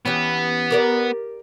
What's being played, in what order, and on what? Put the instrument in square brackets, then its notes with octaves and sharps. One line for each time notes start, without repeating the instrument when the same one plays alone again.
[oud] E3 C#4 G4 [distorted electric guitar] B3
[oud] G4 A#4 D5